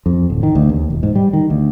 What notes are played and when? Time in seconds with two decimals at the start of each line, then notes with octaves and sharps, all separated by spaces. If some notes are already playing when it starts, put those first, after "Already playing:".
0.06 F2
0.30 D1
0.43 D#3
0.55 D2
0.69 D#2
0.90 E1
1.03 G#2
1.15 G3
1.33 D#3
1.50 D2